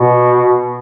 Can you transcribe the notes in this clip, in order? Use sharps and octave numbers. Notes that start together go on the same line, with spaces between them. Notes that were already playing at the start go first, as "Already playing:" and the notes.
Already playing: B2